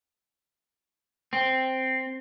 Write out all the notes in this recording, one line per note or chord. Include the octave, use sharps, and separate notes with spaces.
C4